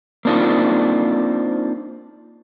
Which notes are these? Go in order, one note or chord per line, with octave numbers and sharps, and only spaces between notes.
A#3 C4 D4 D#4 F4